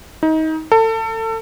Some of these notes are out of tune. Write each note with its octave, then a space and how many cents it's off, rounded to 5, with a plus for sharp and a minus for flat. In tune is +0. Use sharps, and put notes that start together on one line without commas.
D#4 +25
A4 +30